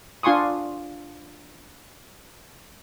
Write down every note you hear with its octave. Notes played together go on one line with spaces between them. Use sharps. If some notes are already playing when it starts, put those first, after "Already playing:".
D4 F4 G#5 C6 C#6 D#6